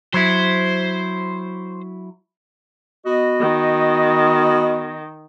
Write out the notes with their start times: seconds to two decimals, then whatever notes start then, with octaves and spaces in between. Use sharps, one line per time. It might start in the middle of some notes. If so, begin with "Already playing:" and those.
0.14 F#3 E4 C5
3.05 B3 F#4 D#5
3.40 D#3